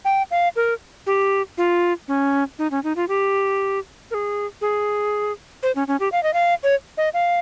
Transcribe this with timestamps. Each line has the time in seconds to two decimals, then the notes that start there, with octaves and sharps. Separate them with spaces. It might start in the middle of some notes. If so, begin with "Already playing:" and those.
0.05 G5
0.31 F5
0.56 A#4
1.07 G4
1.58 F4
2.08 C#4
2.59 D#4
2.71 C#4
2.84 D#4
2.96 F4
3.08 G4
4.11 A#4
4.14 G#4
4.61 G#4
5.63 C5
5.75 C#4
5.88 C#4
6.00 G4
6.12 F5
6.23 D#5
6.34 F5
6.63 C#5
6.97 D#5
7.14 F5